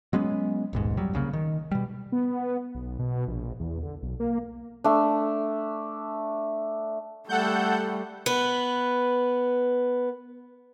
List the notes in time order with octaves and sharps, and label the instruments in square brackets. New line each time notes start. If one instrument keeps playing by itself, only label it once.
[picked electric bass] F#3 G#3 B3 C#4
D#1 B1 G#2
F2 F#3 G3
C2 C#3 F3 A#3
D#3
B2 G3
[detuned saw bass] B3
B1
B2
A#1
E2
D3
B1
A#3
[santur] A3 D4
[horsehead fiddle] G3 A3 [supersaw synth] A4 F#5 G6
[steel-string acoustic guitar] B3 B4